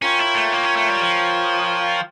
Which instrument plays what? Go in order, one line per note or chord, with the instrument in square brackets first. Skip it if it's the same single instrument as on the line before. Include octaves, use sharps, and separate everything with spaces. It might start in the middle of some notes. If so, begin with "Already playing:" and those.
[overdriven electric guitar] C#4 [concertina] F4 A#4 C#5 G5
[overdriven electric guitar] E4
A3
A#3
C#4
A3
G3
F3